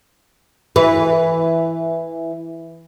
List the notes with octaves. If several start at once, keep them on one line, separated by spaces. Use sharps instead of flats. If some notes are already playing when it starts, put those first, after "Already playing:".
E3 B4